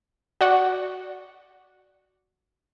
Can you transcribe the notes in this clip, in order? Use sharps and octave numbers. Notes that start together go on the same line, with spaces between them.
F#4 D5 F#5 C#6